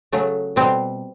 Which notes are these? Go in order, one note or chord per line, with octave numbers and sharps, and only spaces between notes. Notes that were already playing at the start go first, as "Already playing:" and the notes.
C#3 F#3 A3
B2 G3 C4